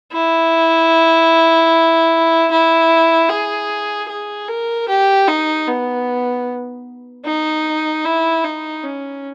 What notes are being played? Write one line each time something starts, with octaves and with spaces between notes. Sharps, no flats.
E4
E4
G#4
G#4
A#4
G4
D#4
B3
D#4
E4
D#4
C#4